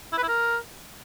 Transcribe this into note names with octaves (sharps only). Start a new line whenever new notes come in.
E4
B4
E4
A#4